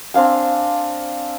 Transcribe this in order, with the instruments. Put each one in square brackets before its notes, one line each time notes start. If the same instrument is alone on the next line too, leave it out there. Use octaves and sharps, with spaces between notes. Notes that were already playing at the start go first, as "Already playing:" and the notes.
[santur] C4 D4 F5 G#5